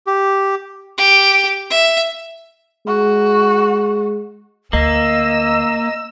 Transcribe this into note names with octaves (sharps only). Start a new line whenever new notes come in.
G4
G4
E5
G#3 F#4
D2 A#3 D#5 E6